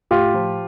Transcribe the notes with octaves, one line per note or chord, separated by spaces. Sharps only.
A2 F4 G4
F3